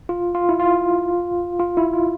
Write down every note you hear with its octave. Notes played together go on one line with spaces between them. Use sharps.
F4
F4
E4
F4
F4
E4
F4